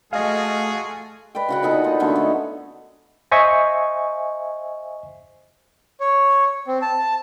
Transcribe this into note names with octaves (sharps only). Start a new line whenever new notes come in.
A3 F4 F#4 G#4 D#5 F5
B4 D5 D#5 G5
C#3 F#4 F#5
A#2 B3 D#4 A4
F4 F#5
D3 F#3 A3 C#4
D#4
C5 D#5 E5 G#5 C#6
C#5
C4
A5